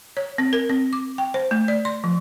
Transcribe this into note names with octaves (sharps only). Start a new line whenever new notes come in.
C#5
C4
A#4
C4
D6
G5
C5
A3
D5
C6
F3